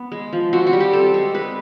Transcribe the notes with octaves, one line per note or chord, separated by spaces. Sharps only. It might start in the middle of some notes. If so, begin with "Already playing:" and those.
Already playing: B3
G#3
F3
C4 F#4
F#4
G3
G4
C4 A4
G#3
G#3 B4